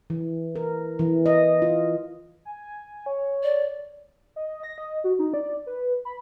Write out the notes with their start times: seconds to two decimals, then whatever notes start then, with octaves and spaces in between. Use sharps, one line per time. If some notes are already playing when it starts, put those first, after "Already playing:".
0.10 E3
0.56 A#4
0.99 E3
1.26 D#5
1.62 F4
2.45 G#5
3.06 C#5
3.43 D5
4.36 D#5
4.63 A#6
4.78 D#5
5.04 F#4
5.19 D#4
5.34 D5
5.67 B4
6.05 B5